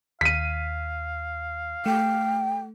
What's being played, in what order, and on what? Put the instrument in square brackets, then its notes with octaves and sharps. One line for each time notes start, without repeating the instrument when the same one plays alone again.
[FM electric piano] D#2 [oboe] F5 [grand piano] B6 D#7
[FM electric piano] A3 [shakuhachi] G5